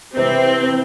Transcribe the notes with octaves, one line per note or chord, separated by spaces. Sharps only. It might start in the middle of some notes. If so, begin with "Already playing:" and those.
C3 E3 C4 B4